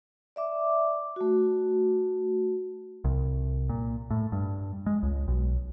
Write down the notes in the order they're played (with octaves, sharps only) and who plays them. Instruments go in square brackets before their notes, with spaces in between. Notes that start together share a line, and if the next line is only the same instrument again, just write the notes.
[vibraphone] D5 E5 D6
A3 F#4
[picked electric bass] C2
A#2
A2
G2
G#3
C#2
B1